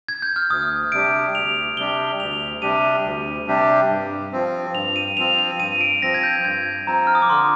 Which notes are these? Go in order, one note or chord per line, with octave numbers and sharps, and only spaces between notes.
G#6
G6
F6
D2 D#6
C3 G3 D4 G4 D7
D2 F7
C3 G3 D4 G4 G7
D2 F7
C3 G3 D4 G4 D#7
D2
C3 G3 D4 G4
G2
F3 C4
G2 F7
D#7
F3 C4 F7
F7
G2 D#7
D7
F3 C4 A#6
G#6
G6
G2 G#6
F3 C4 A#5
F6
D#6
D6
D3 C6